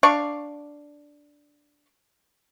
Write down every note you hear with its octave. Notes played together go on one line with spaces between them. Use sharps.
D4 D5 F5 C#6